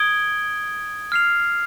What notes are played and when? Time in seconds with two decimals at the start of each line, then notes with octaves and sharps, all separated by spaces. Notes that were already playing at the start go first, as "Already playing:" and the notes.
Already playing: D#6 G#6 D7 G7
1.12 F6 C7 F7